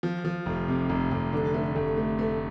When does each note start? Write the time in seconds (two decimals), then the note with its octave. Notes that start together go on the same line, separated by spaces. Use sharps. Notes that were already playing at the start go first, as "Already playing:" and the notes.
0.03 F3
0.25 F3
0.46 F1
0.68 C3
0.90 F1
1.11 F1
1.33 D3
1.54 A3
1.76 F1
1.97 A3
2.19 A3